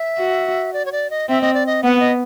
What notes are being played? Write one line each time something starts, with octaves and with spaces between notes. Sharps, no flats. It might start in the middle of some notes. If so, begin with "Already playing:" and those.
Already playing: E5
F#4
D5
C#5
D5
D#5
C4 E5
D#5
D5
D#5
B3 F#5
D#5